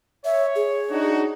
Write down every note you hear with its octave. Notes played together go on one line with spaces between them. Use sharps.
C#5 E5
G#4
D4 D#4 F#4